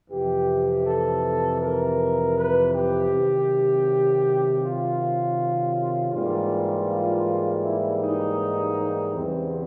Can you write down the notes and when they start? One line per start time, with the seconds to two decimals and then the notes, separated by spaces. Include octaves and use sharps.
0.10 F2 C3 E3 G4
0.86 A4
1.61 A#4
2.37 B4
2.74 G4
3.11 C3 D#3 F#3
4.62 F4
6.12 G#2 E3 G3 A#3 F4
7.63 E4
8.00 D#4
9.13 E2 C#3 E3 G3 C4